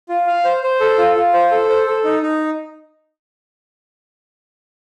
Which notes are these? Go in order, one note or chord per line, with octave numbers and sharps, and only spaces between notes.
F4
F5
C5
C5
A4
F4
F4
C5
A4
C5
A4
D#4
D#4